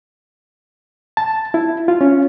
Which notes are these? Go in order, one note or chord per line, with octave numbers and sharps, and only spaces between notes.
A5
E4
F4
C#4